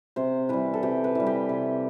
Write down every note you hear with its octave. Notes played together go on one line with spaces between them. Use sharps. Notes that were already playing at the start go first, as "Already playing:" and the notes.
C3 C5
E3 G3 B4
A4
C3 G4
B4
E3 G3
G4
C3